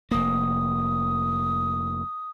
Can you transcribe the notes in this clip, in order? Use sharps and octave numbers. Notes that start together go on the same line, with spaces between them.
F1 A#3 D#6